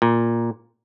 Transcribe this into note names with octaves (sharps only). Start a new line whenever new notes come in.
A#2